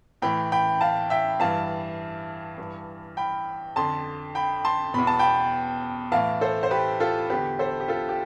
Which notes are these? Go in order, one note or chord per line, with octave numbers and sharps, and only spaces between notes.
A2 E3 G5 B5
G5 B5
F5 A5
E5 G5
G2 E3 F5 A5
G2 E3
G5 B5
F2 D3 A5 C6
G5 B5
A5 C6
E2 B2 B5
A5
G5 B5
A2 E3 F5 A5
A4 C5
C5
G4 B4
F4 A4
E2 D3 G4 B4
A4 C5
G4
F4 A4
G4